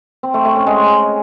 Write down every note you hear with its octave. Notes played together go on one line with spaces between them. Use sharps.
C4
A3
A3
C#4
G#3